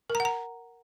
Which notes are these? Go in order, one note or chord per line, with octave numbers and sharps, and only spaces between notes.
A#4
A#5
F#5
A#5